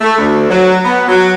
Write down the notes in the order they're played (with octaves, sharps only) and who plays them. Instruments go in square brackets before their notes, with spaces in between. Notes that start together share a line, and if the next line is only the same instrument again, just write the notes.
[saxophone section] A3
D2
F#3
B3
F#3